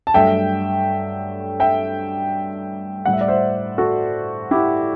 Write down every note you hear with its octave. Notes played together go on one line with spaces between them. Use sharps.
A5
G2 F#3 A3 E5 G5
E5 G5
A2 G3 F#5
E5
D5
C5 E5
F#4 A4
E4 G4